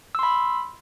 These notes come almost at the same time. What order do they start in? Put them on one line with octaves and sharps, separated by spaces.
E6 C6 B5